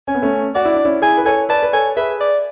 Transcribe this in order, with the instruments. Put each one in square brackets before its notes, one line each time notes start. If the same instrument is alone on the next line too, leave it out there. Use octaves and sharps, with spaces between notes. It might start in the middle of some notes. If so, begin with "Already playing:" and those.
[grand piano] C#4 [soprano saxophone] G#5
[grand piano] B3
A3 C#4
[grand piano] F#4 [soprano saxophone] D5
[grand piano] E4
D4
C#4 E4
[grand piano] E4 G#4 [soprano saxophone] G#5
[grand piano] B4
[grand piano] A4 C#5 [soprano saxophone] G#5
[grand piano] B4 D5 [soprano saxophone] A5
[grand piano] B4
[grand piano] A4 C#5 [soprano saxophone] G#5
[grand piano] G#4 B4 [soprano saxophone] E5
[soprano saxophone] D5